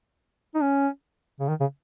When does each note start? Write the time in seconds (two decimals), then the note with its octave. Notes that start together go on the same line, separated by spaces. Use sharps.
0.55 D#4
0.62 C#4
1.40 C#3
1.49 D#3
1.61 C#3